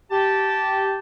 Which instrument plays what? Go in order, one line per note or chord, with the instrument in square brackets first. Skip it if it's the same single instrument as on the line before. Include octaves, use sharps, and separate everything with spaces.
[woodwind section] G4 A5